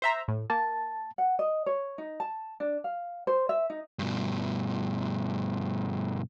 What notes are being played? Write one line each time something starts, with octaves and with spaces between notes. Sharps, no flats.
C5 E5 A#5
A2
A#3 A5
F#5
D#5
C#5
D#4
A5
D4
F5
C5
E5
D#4
G2 B2